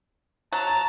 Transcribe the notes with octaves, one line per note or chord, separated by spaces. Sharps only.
F#3 A5 A#5